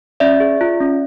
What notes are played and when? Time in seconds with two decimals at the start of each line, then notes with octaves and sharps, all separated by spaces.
0.20 C#4 D5 E5
0.40 G#4
0.61 F4
0.80 C#4